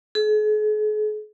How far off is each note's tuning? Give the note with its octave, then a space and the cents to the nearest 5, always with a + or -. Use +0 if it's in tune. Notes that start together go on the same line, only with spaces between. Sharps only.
G#4 +45